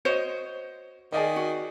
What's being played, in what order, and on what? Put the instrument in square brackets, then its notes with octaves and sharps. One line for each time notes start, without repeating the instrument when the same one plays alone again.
[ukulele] F#4 C5 C#5 [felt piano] D#5 C#7
[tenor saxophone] D#3 [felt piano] G#4 D5 D#5
[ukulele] F#4